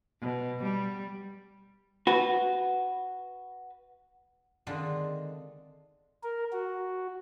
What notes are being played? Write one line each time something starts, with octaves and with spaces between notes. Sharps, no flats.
B2
G3
F#4 B4
D3 D#3 G#3 C4 D4 F4
A#4
F#4